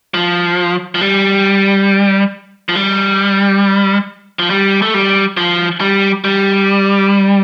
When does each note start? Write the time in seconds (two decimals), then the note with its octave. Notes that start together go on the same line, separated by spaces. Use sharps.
0.14 F3
0.95 F3
1.01 G3
2.69 F3
2.76 G3
4.39 F3
4.50 G3
4.82 A3
4.94 G3
5.37 F3
5.81 G3
6.24 G3